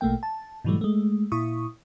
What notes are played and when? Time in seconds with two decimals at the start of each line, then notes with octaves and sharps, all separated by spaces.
0.01 A#1 B2 A3 A#3 G5
0.23 A5
0.65 G#2 B2 E3 F#3 G3 A3
0.81 G#3 A3
1.32 A#2 E4 C#6 D#6